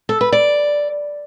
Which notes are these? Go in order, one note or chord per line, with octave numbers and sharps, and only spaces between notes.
A4
B4
D5